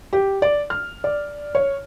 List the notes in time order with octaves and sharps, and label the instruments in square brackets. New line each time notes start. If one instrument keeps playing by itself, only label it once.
[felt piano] G4
D5
F6
D5
C#5